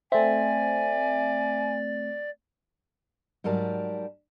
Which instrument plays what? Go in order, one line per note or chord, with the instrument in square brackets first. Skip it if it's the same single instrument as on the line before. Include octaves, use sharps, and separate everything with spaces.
[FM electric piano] A3 C4 [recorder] D5 [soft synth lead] E5 [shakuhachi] G#5
[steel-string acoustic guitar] G#2 F#3 G3 A#4 A5